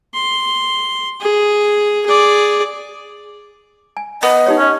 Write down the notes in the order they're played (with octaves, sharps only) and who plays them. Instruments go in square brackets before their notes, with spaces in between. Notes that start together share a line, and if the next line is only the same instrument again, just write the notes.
[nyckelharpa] C6
G#4
G#4 D5
[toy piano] G#5
[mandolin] B3 [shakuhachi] D#5
[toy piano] D#4 G4 C#5
[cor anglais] C#4